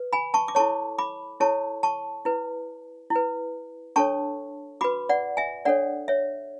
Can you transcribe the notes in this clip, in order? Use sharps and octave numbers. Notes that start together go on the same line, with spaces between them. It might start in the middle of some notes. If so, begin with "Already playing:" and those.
Already playing: B4
G#5 B5
A5 C#6
D6
E4 A4 C#5 A5 C#6
B5 D6
E4 A4 C#5 A5 C#6
A5 C#6
E4 B4
E4
B4
D4 A4 C#5 A5 C#6
F#4 B4 B5 D6
D5 F#5
E5 G#5
D4 A4 C#5 D5 F#5
C#5 E5